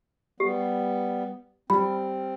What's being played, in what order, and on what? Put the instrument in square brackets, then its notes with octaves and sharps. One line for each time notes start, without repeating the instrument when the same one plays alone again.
[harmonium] G3 B3 [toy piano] G4
[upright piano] G3 [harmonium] C4 [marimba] B5